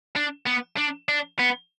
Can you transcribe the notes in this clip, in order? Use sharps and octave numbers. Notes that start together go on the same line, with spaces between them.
D4
B3
D4
D4
B3